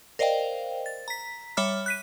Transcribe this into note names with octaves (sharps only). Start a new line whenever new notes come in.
A#4 C5 D5 D#5 F5 G5
A6
A#5 B6
G3 C#5 E5 B5 D6 F6
F#6 B6 D#7